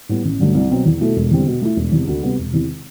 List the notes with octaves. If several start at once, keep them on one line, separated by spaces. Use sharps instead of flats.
A2 G3 B3
A1
G2 D3 F#3 A3
C2
B2 F#3 C4
E2
B2 A3 E4 A4
E1
E2 D3 G3 C4
B2
A3 E4
E1
E2 C3
D2
C3 G3 B3
E1
E2 C3 E3